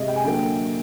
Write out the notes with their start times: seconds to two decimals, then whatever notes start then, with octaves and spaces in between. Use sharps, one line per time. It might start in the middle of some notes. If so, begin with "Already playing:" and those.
Already playing: C3 G#3 D#5
0.08 G5
0.16 G#5
0.24 D3 F#3 A#3 G5